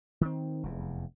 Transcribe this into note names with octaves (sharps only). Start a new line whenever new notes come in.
D#3 C4
F1 E2